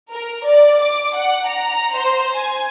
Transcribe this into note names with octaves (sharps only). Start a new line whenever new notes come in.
A#4
D5
D6
F#5
A#5
C5
G#5